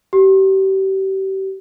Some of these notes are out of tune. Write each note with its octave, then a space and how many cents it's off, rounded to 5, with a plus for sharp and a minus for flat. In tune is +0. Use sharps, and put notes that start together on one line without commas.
G4 -35